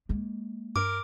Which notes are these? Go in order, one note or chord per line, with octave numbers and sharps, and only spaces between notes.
G#3 A#3
G2 A#4 D6